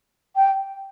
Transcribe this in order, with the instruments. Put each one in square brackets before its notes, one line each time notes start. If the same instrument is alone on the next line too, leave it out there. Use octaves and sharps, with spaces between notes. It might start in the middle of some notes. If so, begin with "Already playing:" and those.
[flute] G5